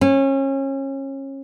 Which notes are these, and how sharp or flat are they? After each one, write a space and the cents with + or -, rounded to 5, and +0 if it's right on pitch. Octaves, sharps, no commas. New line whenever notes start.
C#4 -30